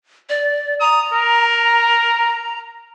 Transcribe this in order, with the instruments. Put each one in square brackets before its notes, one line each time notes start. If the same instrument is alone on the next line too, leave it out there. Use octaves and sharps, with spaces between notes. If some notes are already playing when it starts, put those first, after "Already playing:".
[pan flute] D5
[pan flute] A#5 [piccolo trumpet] D#6
[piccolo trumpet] A#4